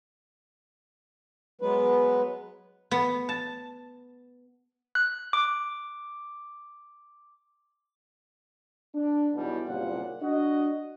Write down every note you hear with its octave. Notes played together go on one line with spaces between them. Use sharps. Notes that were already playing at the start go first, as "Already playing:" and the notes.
F#3 G#3 B3 B4
B3
A5
F#6
D6
D4
B1 E2 B2 E3 G3
F#1 C2 A#2 G3 F#5
D4 F#4 D#5